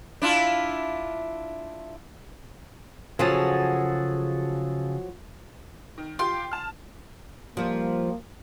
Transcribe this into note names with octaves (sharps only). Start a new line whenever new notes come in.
D4 E4 F4
C#3 F3 F#3 F#4 G#4 A4
D#3
F4 G4 G5 C6
A5 F6
F3 G3 A#3